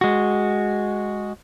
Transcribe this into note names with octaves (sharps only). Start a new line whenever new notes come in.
G#3 F#4